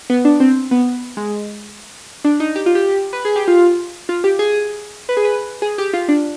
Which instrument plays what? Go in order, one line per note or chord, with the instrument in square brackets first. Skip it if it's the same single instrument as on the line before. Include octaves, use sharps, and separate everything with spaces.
[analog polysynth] B3
D4
C4
B3
G#3
D4
D#4
G4
F4
G4
B4
G#4
G4
F4
F4
G4
G#4
B4
G#4
B4
G#4
G4
F4
D4